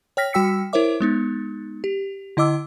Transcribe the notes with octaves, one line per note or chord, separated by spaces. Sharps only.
C#5 G5 F6 A#6 B6
G3 F#4 G5 E6 B6 C#7
E4 A#4 C5 C#5 E5 D6
G#3 B3 D#4
G4
D3 E4 D#5 D6 E6